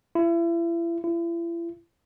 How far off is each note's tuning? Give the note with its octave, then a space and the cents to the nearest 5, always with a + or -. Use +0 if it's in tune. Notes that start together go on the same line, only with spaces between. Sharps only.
E4 +35
E4 +40